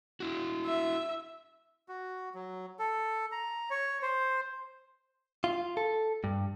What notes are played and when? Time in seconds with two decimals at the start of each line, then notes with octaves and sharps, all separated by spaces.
0.20 E4 F#4
0.65 E5
1.88 F#4
2.35 F#3
2.79 A4
3.32 A#5
3.70 C#5
4.02 C5
5.44 F4
5.77 A4
6.24 G2